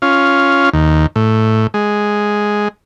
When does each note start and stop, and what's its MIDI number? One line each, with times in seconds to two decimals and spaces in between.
0.02 0.70 61
0.02 0.70 65
0.73 1.06 39
1.16 1.67 45
1.74 2.68 56